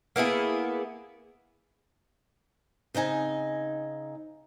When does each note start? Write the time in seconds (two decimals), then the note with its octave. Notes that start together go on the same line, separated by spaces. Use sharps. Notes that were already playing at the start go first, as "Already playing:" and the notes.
0.16 A#3 B3 E4 G#4
2.94 C#3 C4 D#4 G#5